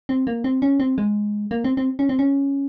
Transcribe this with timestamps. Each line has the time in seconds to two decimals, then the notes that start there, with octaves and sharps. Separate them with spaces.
0.09 C4
0.27 A#3
0.44 C4
0.62 C#4
0.80 C4
0.98 G#3
1.51 A#3
1.64 C4
1.77 C4
1.99 C#4
2.09 C4
2.19 C#4